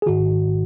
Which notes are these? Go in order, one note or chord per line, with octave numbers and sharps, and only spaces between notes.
G#4
G#1 G#2 D#3 F#4